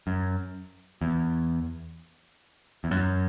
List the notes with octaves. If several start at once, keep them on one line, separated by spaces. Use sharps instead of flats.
F#2
E2
E2
F#2